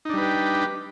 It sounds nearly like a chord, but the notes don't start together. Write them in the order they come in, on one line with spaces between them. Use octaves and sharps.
D#4 D4 G3 B4 G4